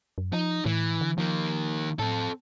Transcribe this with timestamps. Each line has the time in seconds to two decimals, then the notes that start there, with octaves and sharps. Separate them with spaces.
0.18 F#2
0.33 F3 D#4
0.66 A2 E3
1.01 D3
1.18 D#3 F3 A#3
1.99 A2 C4 A4